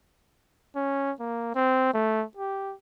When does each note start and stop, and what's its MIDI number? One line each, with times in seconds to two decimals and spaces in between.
0.76 1.11 61
1.20 1.54 58
1.55 1.91 60
1.94 2.24 57
2.37 2.74 67